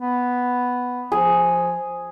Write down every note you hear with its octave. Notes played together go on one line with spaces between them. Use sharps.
B3
F3 G#4